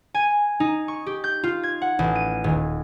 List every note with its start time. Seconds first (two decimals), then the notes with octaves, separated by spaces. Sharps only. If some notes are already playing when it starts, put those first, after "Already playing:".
0.14 G#5
0.60 D#4
0.88 C#6
1.06 G4
1.24 G6
1.44 F4
1.63 G#6
1.82 F#5
1.99 A1
2.15 D#7
2.44 D#1